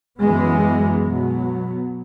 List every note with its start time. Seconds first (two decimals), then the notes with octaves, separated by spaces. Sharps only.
0.20 F#2 E3 G#3 B3
1.04 B2 F#3 B3